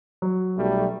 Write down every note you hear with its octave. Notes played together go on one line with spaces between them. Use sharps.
F#3
B1 G3 A3